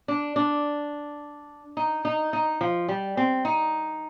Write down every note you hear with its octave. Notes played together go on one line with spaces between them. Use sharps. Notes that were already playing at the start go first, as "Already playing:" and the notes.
D4
D4
D#4
D#4
D#4
F3
G3
C4
D#4